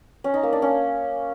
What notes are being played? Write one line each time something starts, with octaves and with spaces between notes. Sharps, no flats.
C#4
D#4
A#3
D4
C#4